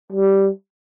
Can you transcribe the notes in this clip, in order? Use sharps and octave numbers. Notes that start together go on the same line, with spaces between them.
G3